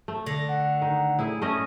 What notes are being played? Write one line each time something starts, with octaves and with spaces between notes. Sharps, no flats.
A3
D3 A#6
F#5
D#3
A2 E4 G#4
A3 C#4 D#5